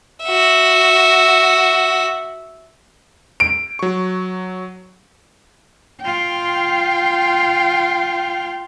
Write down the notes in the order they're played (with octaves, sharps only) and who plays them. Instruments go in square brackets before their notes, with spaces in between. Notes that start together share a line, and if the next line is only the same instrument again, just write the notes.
[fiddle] F#4 E5
[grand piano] D7
[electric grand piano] F#3 C#6
[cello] F4 G5